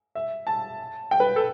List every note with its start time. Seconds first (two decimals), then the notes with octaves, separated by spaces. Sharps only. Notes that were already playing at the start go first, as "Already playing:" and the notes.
0.15 E5
0.47 A5
1.11 G5
1.20 B4
1.36 A4